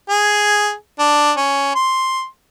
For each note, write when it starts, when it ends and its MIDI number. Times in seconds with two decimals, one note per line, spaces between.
0.09 0.73 68
0.99 1.32 62
1.37 1.75 61
1.75 2.25 84